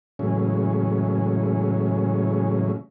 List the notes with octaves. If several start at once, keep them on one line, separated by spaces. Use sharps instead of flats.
A2 C#3 E3 F#3 G#3 C#4